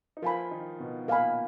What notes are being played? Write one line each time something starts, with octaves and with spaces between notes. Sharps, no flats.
D#4
F3 F4 A#4 F5 G#5 B5
D#3 D#4
B2 B3
A#2 A#3 A#4 F5 G#5 B5